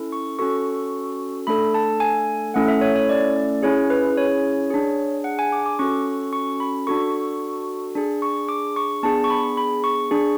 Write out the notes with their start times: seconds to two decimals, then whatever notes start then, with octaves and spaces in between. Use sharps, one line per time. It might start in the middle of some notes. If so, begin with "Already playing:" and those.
Already playing: C#4 E4 A4
0.12 C#6
0.39 C#4 F#4 A4 C#6
1.47 A3 D4 A4 B5
1.74 A5
2.00 G#5
2.54 A3 C#4 E4 A4 F#5
2.68 E5
2.81 C#5
2.96 C#5
3.09 D5
3.63 C#4 E4 G#4 C#5
3.90 B4
4.17 C#5
4.70 D4 G#4
5.24 F#5
5.39 G#5
5.52 D6
5.66 D6
5.79 C#4 F#4 A4 C#6
6.33 C#6
6.60 B5
6.87 D4 F#4 A4 C#6
7.95 D4 G#4
8.22 C#6
8.49 D6
8.76 C#6
9.03 B3 D4 G#4 A5
9.24 C#6
9.30 B5
9.57 B5
9.84 C#6
10.11 D4 G#4